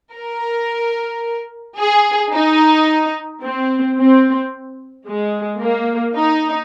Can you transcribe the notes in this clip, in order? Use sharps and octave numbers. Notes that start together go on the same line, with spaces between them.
A#4
G#4
D#4
C4
C4
G#3
A#3
D#4